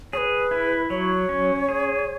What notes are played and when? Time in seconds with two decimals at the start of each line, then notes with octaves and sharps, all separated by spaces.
0.13 G#4 B4 C#5
0.51 E4
0.90 F#3 C#5
1.29 C#4
1.69 G#4